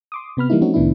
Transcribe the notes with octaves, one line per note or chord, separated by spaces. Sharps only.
C6 D6 D#6
C3 B3 B5 F6
E3 G3 A#3 D#4 E4
F3 A3 C4 C#4 D#4 F#4
C2 A2 D#3 B3 D4 E4